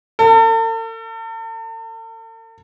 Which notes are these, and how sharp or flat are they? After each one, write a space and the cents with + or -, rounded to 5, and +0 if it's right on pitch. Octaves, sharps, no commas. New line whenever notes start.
A4 +45